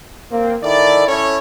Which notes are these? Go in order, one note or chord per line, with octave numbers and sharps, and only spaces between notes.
A#3 C4
D#3 E4 A4 D5
C#4 E4 A4 C#5